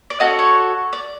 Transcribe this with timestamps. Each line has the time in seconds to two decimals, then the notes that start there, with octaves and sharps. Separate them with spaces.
0.10 D5
0.20 C#4 F#4 A4 D#5
0.39 C#5
0.93 D5